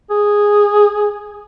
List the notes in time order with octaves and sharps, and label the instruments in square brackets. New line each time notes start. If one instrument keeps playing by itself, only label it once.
[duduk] G#4